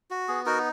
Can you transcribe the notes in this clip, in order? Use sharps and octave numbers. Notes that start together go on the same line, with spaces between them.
F#4
B3 G#4
D#4 F#4 A#4